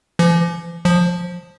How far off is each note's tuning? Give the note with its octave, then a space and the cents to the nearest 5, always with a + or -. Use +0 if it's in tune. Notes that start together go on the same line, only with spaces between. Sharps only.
F3 -45
F3 +15